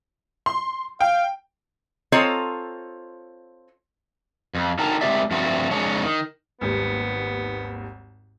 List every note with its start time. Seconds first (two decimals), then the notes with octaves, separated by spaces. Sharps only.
0.46 C6
1.01 F5 G5
2.12 C4 F4 A4 C#5 D#5 A#5
4.55 F2
4.79 D3 D#4 A#4 G5 A5 A#5
5.01 G#3 C4 E4 G4 D5 E5
5.31 G2 F3 A3 C4 F#4
5.71 F2 G#3 D4 C#5
6.03 D#3
6.61 G#1 D#2 G3 B3